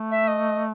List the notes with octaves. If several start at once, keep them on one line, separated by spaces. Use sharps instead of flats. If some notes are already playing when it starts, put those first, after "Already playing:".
Already playing: A3
E5
D#5